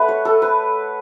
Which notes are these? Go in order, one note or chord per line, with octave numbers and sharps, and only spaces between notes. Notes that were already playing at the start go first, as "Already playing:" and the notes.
Already playing: A3 B4 F#5 A5
C#5
A4
B4